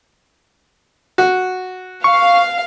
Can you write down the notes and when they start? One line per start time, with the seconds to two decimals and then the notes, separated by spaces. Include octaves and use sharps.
1.18 F#4
2.04 F5 C#6